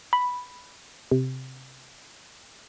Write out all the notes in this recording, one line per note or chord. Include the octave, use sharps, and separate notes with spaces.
B5
C3